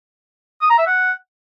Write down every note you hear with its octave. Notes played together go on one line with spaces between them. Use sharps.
D#6
A#5
E5
F#5